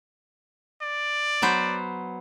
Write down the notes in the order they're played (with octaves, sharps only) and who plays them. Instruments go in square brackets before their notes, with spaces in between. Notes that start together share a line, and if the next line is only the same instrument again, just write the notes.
[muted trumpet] D5
[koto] F#3 B3 C5